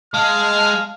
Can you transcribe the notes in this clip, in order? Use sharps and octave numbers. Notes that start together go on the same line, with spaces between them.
G#3 F5 A5 F6